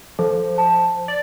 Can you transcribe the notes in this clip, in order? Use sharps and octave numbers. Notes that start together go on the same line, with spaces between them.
F3 A4
A5
D5